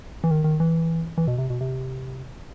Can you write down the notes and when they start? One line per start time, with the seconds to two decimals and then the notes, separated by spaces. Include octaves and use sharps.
0.24 E3
0.31 D#3
0.44 D#3
0.60 E3
1.18 E3
1.28 B2
1.38 C3
1.50 B2
1.61 C3